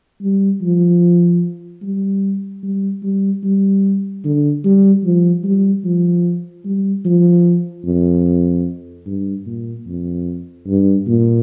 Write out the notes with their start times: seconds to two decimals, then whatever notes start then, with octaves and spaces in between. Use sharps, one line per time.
0.22 G3
0.62 F3
1.82 G3
2.63 G3
3.03 G3
3.43 G3
4.24 D3
4.64 G3
5.04 F3
5.44 G3
5.84 F3
6.65 G3
7.05 F3
7.85 F2
9.06 G2
9.46 A#2
9.87 F2
10.67 G2
11.07 A#2